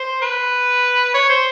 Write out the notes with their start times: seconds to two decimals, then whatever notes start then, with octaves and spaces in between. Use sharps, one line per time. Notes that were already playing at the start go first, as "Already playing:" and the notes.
Already playing: C5
0.22 B4
1.14 C#5
1.30 C5